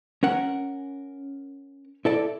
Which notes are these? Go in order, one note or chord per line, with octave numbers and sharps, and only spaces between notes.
C#4 A#4 F#5
E4 A4 D5